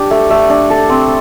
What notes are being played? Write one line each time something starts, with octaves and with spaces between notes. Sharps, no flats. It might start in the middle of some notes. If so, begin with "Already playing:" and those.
Already playing: D4 G4
A3
A3
D4
A4
C4